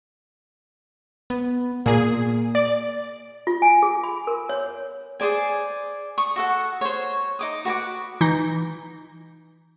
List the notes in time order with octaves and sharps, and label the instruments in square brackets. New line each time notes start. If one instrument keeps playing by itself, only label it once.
[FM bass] B3
[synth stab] A#2 G#4 [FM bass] A#3
[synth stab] D5
[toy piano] F4
G#5
G#4
B5
A#4
C#5
[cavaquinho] G#4 C5 D5 G#5
C#6 D#6
F#4 A4 F#5
C5 C#5
D#4 D6 D#6
F#4 B4 G#5 D6
[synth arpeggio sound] E3 D#4